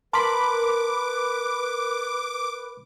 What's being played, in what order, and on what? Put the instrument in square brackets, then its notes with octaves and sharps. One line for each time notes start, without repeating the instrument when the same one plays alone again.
[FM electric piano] A#4 B5 [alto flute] B4 [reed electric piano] A5 C6 [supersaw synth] D6